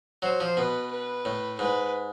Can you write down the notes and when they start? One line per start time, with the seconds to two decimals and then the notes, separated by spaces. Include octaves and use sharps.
0.22 F#3 C5
0.40 F3
0.57 B2 B4
0.91 B4
1.25 A2
1.59 G#2 B4